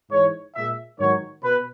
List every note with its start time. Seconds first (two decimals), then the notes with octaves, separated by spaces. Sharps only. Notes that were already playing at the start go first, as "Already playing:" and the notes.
0.11 G#2 E3 G#3 C#5
0.56 A#2 G#3 E5
0.99 G#2 D#3 F#3 C#5
1.43 B2 B4